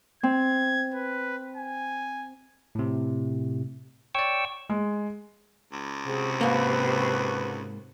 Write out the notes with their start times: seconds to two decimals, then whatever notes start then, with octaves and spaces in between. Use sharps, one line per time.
0.23 C4 G#6
0.94 B4
1.57 G#5
2.75 A2 C3
4.15 C#5 D5 G5 C#6 E6
4.69 G#3
5.72 C#2
6.07 C3 F#4 G#4
6.41 G#2 A#3 B4